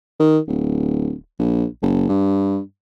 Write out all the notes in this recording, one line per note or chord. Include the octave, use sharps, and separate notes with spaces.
D#3
D1
A#1
F#1
G2